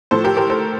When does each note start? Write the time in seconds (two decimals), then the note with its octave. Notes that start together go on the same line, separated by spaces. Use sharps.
0.11 A2 F3 A4 C5
0.24 G4 A#4
0.37 G4 A#4
0.50 A4 C5